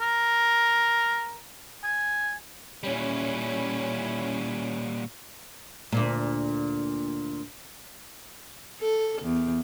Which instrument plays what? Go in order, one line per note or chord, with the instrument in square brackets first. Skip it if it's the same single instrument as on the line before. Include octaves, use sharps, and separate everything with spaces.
[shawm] A#4
G#5
[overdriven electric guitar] A#2 G3 [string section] C#4 E4
[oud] D2 A#2
[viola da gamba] A4
E2